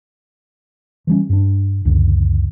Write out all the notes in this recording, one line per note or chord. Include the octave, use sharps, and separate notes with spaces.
E3 G3 C#4
G2 D4
C#2 F#2 D3